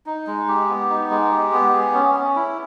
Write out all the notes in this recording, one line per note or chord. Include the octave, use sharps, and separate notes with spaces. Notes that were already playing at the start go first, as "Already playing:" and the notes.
D#4
G#3
G4
B3
D#4
G#3
G4
B3
G#4
C#4
C#4
E4